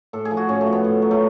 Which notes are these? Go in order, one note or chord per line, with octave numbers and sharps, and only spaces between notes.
A2 A4
G#4
F3
F#4
A2 C#4
A3
F3
B3
A2
F#3
A3